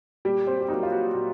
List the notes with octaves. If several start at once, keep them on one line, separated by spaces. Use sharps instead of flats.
A#2 G3 G4
C4 C5
G4
F#3 A#3 D#4 F#4
F4
F#4
A#2 F#4